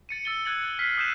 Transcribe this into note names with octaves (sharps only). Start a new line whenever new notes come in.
A6 C#7 D#7
E6 A6 D#7 G7
F#6 G#6 A6 C#7 F#7
F6 B6 C7
D#6 F#6 G6 D#7 E7